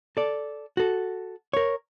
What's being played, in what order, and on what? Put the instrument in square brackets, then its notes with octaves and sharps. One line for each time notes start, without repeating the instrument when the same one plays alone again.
[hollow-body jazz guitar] A4 D5
F#4 A4
A#4 C#5